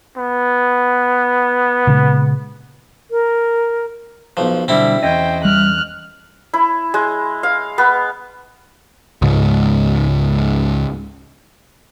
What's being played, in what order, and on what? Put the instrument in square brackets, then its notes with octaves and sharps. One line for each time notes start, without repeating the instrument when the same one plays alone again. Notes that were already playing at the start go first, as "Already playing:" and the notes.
[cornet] B3
[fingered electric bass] A#2 C#3 G#3
[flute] A#4
[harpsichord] B1 F3
[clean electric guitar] B1 D3 G3 [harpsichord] C4 E4
[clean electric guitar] E2 C#4 D#5 [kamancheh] C5 G5
[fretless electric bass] G3 [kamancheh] F6 F#6
[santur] E4
G#3
F5
B3
[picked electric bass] C#2 G#2